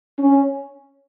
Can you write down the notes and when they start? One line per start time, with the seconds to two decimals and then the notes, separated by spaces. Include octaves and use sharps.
0.18 C#4